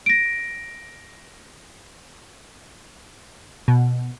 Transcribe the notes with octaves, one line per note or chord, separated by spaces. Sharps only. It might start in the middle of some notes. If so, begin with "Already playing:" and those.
A#6 D7
B2